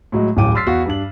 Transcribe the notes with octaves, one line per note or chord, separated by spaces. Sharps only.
A2 F#3 G#3
D1 A1 G2 G5 D6 D#7
C6 E6 F6 A6 B6 C7
E2 F#4 F5
G2 D4 F#7